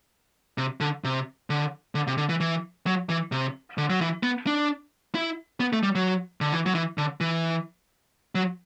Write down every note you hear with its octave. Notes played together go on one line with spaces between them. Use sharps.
C3
D3
C3
D3
D3
C3
D3
E3
E3
F#3
E3
C3
D3
F#3
E3
B3
D4
E4
B3
A3
G3
F#3
D3
E3
F#3
E3
D3
E3
F#3